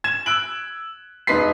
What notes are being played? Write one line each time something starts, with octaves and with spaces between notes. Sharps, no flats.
G#6 E7
E6 F#6 D7 F#7
E1 D#4 B4 C6 B6 C7